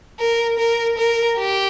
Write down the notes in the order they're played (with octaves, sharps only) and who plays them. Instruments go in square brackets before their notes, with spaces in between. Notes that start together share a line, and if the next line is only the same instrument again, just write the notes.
[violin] A#4
A#4
A#4
G4